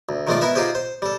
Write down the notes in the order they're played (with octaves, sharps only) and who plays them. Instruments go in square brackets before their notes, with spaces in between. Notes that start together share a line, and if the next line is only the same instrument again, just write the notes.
[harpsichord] D2
D#3 F3 G#3 A3 F4 D5
B3 E4 A#4 E5
D#4 F4 G4 G#4 C5
C5
G3 A4